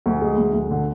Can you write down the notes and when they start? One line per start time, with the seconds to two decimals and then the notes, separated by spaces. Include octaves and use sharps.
0.06 D2
0.21 G#3
0.37 D2
0.54 D2
0.71 D3